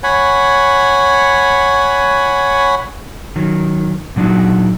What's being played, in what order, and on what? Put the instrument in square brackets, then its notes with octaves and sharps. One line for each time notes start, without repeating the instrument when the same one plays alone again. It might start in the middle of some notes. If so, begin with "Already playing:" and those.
[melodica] C#5 F#5 G#5 B5
[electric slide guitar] D#3 F#3
A#2 F#3 D4 D#4 F#4